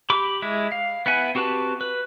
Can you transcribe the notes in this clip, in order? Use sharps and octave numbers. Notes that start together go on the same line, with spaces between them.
G4 B5 D6
G#3 E4
F5
B3 E4 F#5 G#5
C4 F#4 G4 B4 A5
B4